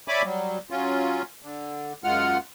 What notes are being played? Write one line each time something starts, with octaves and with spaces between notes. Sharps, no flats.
C#5 D5 E5 G#5 B5 D6
F#3 G3
F#3 C#4 F4
D3
F#2 G#3 F4 F#5 F6